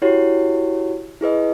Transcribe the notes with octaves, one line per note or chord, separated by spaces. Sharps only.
E4 F#4 G4 C#5
E4 G#4 B4 D#5